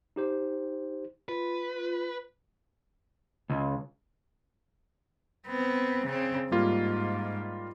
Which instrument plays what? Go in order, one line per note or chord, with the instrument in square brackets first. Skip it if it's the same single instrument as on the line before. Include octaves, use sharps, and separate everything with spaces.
[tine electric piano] D#4 G4 C5
[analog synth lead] F4 [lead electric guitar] B4
[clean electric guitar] C#2
[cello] B3 C4
C#3 C4
[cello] G#2 [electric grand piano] G3 A#3 F4